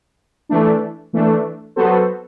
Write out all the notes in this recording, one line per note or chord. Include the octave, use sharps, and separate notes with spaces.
E3 A3 D4
E3 A3 D4
F#3 B3 F#4 A4 C5